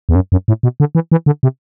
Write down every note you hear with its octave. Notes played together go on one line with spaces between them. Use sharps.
E2
F#2
F#2
A2
B2
D3
E3
E3
D3
C3